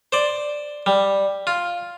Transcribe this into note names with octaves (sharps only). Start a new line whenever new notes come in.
C5 D5
G3
F4